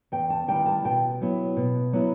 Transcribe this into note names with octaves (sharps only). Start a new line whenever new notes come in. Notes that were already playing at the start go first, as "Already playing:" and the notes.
E2 G5
A5
D#3 G3 B3 E4 G5
A5
B2 G5
F#3 B3 E4
B2
F#3 B3 E4